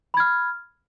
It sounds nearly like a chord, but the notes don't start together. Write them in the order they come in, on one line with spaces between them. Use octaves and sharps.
B5 G#6 F6